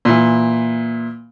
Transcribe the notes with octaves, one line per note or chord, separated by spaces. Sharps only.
A#2 E3